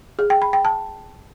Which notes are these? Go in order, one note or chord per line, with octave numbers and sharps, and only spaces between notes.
G#4
G5
B5
G5
A5